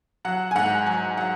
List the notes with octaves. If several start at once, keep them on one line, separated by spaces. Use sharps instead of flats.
F#3 F#5
G#5
G#2 F#5
F#3 G#5
F#3 F#5